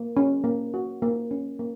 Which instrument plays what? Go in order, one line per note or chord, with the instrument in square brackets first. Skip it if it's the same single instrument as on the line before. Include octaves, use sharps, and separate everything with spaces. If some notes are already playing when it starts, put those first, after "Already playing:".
Already playing: [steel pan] A#3
C#4
A#3
F#4
A#3
C#4
A#3